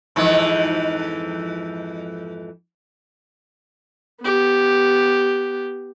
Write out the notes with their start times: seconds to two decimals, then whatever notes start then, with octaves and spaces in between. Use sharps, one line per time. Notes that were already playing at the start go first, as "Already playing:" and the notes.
0.16 F2 G#2 E3
4.22 B3 G4